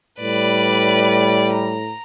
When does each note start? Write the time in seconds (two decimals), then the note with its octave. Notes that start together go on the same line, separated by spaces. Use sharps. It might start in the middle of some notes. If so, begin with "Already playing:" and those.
0.20 A2 G3 B4 D5
1.52 A#5